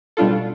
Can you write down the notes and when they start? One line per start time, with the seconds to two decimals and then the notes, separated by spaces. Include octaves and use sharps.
0.17 B2 G3 D4 F4 A4